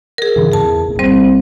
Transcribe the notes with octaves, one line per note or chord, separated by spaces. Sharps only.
G#4 A#4
G#2 C#3 E3
E2 G#4 A5
D#1 A1
A#1 G3 C4 C5